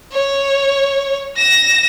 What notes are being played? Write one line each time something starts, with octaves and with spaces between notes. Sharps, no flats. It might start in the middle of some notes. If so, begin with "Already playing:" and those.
C#5
A#6 E7